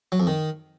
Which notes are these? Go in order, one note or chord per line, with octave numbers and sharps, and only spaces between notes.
F#3
F2
D#3